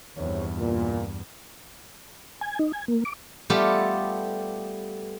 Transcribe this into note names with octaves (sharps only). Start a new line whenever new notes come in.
G#1 E2 G2 C3 C#5
A#2
G#5
D#4
G#5
A#3
D6
G3 A3 B3 F4 G4 A4